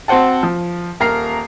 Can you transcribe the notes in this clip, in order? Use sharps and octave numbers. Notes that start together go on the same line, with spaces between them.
C4 F#4 C5 F#5 A5
F3
D#1 A#4 A#5 C7